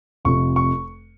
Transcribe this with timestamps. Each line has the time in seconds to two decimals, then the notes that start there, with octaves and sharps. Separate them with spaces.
0.25 F1 F2 C3 C#6
0.56 C#6